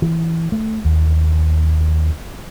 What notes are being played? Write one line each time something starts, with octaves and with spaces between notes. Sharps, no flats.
E3
A3
D#2